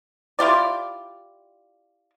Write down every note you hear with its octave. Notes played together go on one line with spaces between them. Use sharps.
E4 F4 G4 D5